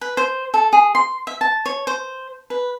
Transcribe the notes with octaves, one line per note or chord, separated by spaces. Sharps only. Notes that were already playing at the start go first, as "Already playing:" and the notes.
B4
C5
A4
G#4
C6
E5
A5
C#5
C5
B4